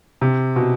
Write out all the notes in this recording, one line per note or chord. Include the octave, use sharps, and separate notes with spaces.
C3
B2